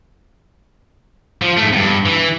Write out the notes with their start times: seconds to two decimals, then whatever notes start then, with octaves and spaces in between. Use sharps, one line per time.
1.42 F3 F4
1.57 G#2 A3
1.73 E2 G2
2.06 E3